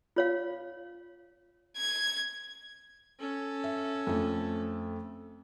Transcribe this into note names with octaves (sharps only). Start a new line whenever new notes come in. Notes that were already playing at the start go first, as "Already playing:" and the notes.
F4 C#5 F5
G#6
C#4 A4
E5
F2 A3